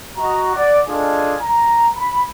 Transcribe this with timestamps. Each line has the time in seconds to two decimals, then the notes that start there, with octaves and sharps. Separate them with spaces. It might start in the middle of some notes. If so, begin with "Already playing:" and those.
0.17 F#4 D#5 A#5
0.55 D5 F#5
0.88 D4 F4 G#4 A4 D#5 G#5
1.42 A#5
1.96 B5